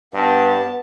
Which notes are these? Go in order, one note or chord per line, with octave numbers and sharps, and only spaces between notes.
G2 B3 A5